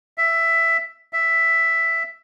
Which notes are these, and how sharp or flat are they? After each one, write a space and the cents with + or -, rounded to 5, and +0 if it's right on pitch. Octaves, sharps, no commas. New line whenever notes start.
E5 +10
E5 +5